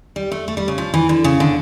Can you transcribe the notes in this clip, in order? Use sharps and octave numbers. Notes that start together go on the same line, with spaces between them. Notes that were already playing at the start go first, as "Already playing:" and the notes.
G3
A3
A3
G3
C#3
F3
E3
D3
C#3
D3